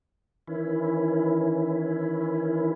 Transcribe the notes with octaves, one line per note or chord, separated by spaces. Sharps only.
D#3 E3 C#4 E4